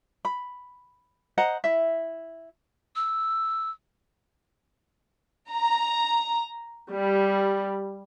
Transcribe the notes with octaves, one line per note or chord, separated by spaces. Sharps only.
B5
C5 D#5 F#5 A#5
E4 E5
E6
A#5
G3